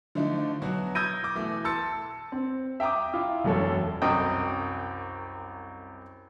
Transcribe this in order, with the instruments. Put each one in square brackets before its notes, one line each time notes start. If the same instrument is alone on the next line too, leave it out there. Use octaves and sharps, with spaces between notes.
[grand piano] D3 F3 A3 D4 D#4
B2 F#3 F#4
D#6 E6 G6 G#6 A#6 D#7
D6
B2 E3 A3
A5 C6 E6 A6 C#7
[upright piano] C4
E5 G5 A#5 D6 D#6
E4 F4
E1 F#2 A4 C#5
[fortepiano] C2 F#2 D#5 G5